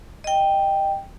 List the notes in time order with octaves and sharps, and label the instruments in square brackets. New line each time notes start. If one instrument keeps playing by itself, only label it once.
[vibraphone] D#5 G5